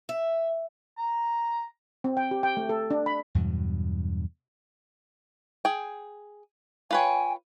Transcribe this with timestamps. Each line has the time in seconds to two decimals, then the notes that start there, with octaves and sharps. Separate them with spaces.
0.09 E5
0.98 A#5
2.04 C4
2.17 G5
2.31 G4
2.43 G5
2.57 A3
2.69 A4
2.91 D4
3.06 B5
3.35 E2 G2 B2 F#3
5.65 G#4 G5
6.91 F4 B4 C#5 G5 G#5